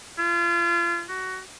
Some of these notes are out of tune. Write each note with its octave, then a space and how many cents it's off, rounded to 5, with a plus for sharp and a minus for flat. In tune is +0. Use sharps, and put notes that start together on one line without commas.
F4 -35
F#4 +20